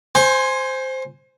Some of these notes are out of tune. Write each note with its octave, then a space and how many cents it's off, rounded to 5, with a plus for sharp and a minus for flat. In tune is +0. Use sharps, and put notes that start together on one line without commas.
C5 +0 G#5 +0 C6 +40